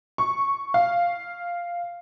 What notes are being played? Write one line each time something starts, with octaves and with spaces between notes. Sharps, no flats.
C#6
F5